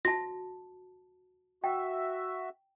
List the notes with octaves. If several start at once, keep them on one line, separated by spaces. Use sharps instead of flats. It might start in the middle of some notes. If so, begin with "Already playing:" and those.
F#4 A5 A#6
F#4 E5 G5